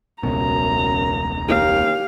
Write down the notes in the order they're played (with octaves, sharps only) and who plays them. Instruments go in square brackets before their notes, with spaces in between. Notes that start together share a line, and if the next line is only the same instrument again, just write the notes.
[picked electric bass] E1 C#2 B2 [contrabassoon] F#2 [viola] A#5
[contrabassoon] D#2 [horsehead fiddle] G4 F5